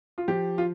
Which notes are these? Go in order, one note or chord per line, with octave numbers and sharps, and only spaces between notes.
F4
F3 G4
F4